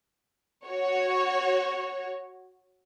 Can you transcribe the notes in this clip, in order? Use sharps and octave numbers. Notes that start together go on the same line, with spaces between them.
F#4 C#5